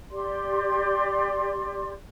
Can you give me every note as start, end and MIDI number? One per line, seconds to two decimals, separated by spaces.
0.10 1.91 67
0.10 1.91 74
0.10 1.91 84